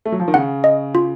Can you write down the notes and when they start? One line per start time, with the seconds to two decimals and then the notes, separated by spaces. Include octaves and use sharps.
0.05 A3
0.12 F#3
0.20 F3
0.28 D#3
0.34 C#3 F#5
0.64 D#5
0.95 F4